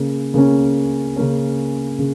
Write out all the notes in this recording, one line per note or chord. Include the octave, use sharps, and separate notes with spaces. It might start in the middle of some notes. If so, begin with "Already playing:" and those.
Already playing: C#3 A#3 C#4
C#3 A#3 C#4
C#3 A#3 C#4
C#3